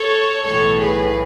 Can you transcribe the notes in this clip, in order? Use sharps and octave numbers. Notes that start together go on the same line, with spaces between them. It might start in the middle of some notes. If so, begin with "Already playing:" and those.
Already playing: A4 C#5
B1 A2 E3 A4 C#5
G#4 B4